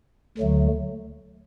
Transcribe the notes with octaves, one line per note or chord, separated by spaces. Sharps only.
D2 D3 F#3 A3